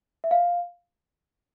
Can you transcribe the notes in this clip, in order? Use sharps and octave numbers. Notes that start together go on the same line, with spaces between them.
E5
F5